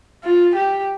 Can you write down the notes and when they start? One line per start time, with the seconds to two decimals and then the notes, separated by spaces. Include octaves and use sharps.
0.24 F4
0.55 G4